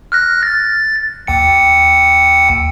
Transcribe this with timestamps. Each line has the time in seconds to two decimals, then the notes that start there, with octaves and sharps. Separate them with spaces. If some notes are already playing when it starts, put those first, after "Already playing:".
0.12 F6 F#6 A#6
0.43 A6
1.27 D#2 G5 C#7